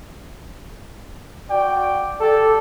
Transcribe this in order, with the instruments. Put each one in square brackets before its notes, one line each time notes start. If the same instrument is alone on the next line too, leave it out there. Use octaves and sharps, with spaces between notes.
[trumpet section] F#4 D5 G5
[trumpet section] G4 D5 [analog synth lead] A4